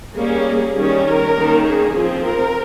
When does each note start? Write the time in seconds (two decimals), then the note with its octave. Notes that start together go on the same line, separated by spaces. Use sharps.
0.16 G3 A#3 C#4 G#4
0.76 D#3 G3 C#4
1.06 A#4
1.36 D#3 A#3 C#4
1.66 G#4
1.95 F3 C4
2.25 A#4